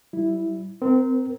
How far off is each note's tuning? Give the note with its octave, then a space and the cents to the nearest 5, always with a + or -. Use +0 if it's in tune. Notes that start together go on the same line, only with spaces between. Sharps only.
G3 -30 E4 +0
C4 -25 A#4 +0